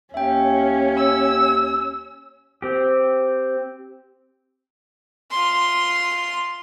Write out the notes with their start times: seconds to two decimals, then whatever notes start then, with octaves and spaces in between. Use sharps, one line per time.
0.14 D#2 C#4 E5 G5
0.97 E6
2.62 C4 G4
5.31 F4 C6